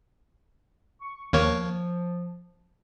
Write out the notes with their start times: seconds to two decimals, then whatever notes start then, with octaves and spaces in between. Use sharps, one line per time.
1.02 C#6
1.33 D#2 F3 A#3 C#5